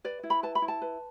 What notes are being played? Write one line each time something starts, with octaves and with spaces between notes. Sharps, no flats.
B4 D5
E4
B5
B4 A5
B5
E4
A5
B4